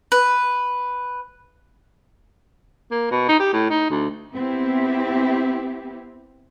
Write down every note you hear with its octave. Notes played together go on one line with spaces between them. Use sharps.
B4
A#3
B2
D#4
G4
A2
D#4
D2
B3 C4 E4 G4